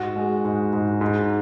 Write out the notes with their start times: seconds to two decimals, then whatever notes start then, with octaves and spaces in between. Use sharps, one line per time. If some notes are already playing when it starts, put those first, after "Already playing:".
Already playing: G#2 F#4
0.16 G#3
0.45 G#2
0.73 G#2
1.01 G#2